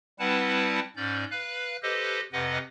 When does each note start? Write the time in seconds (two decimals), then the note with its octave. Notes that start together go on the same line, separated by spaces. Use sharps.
0.19 G3 C4 E4 B4 F#5 A5
0.96 G#2 C#4 D5 G6
1.31 B4 F5 F#6
1.83 G4 A4 B4 C5 D#5
2.32 F2 C3 B4 D#5 F#5